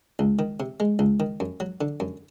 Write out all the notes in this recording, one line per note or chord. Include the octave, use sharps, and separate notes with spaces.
C#2
D#3
C3
G#3
C#2
D#3
F#2
F#3
D3
F#2